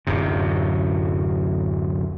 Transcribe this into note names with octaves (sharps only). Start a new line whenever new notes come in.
D1 F#2 C3